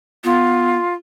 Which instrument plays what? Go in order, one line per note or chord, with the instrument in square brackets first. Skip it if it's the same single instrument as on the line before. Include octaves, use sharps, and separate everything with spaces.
[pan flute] B3 [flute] F4